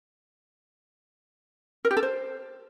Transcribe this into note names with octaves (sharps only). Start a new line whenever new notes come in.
A#4
G4
A4
C5